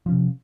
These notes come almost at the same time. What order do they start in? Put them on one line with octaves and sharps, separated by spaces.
F3 C#4 C3